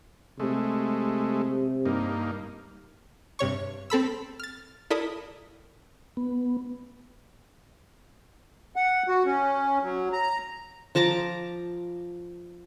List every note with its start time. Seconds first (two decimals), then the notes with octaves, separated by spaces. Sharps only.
0.40 C3 G#3 A3
1.85 G2 A#3 D#4
3.39 G2 C3 C#5 C#6
3.90 C4 A4 B5 E6
4.40 F6 A6
4.90 E4 A4 A#4 D5 E5 D#6
6.17 B3
8.76 F#5
9.08 F#4
9.26 C#4
9.83 F#3
10.13 A#5
10.95 F3 A5 A#5 D6